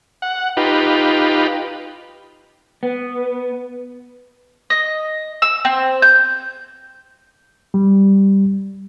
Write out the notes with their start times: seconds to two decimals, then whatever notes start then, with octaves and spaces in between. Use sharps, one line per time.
0.22 F#5
0.57 D#4 F4 G4 B4
2.83 B3
4.70 D#5
5.42 E6
5.65 C4
6.02 G6
7.74 G3